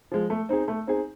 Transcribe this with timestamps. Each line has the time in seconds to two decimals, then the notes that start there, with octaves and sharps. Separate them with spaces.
0.12 F3 G#3
0.30 A3
0.49 C4 D#4 G#4
0.68 A3
0.87 C4 D#4 G#4